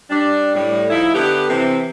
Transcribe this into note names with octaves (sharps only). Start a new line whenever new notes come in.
G3 D4
A2 G3
F3 D#4 E4
D3 B3 G4
C3 E3 C4